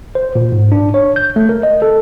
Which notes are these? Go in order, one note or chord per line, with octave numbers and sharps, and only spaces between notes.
C5
A#2
G#2
D4
C#5
G6
A3
A#4
D#5
A4